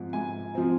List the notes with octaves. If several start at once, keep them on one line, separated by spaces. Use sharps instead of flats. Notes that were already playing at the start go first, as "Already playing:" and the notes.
Already playing: G#2 F3 C4
G#2 G#5
F3 C4